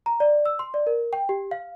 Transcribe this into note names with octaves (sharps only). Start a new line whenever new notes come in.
A#5
D5
E6
C6
D5
A#4
G5
G4
F5